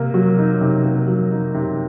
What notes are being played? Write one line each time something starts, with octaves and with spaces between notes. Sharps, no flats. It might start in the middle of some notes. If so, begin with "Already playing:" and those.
Already playing: C3 A#3
F#3
D#4
C3
A#3
F#3
D#4
C3